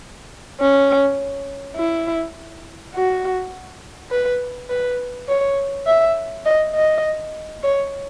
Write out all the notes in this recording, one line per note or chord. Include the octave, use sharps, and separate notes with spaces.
C#4
E4
F#4
B4
B4
C#5
E5
D#5
D#5
C#5